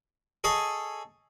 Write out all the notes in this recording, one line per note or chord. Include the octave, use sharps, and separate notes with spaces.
G#4 A4 C#5 D#5